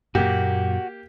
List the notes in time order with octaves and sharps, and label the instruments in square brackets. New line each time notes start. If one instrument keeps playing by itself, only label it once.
[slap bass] F#2 A#2 [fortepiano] A#3 G4 [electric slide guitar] F#4